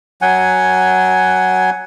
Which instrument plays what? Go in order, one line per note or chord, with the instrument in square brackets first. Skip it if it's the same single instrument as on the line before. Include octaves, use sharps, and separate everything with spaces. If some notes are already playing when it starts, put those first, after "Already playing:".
[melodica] F#3 F#5 G#5